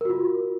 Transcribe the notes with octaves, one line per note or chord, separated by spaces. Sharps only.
F4 F#4 A#4